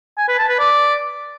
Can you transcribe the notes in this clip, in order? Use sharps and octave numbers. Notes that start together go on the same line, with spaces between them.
G#5
B4
A5
B4
D5